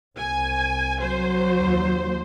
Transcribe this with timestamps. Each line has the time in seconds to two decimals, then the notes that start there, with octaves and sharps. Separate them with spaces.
0.18 C2 G#5
1.01 F#3 C5
1.58 D#2